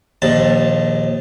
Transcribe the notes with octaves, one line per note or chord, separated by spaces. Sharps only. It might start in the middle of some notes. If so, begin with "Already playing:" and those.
A#1 D#2 A5